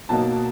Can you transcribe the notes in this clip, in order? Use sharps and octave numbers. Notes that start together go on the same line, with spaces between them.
B2 F#3 A#3 D#4 A5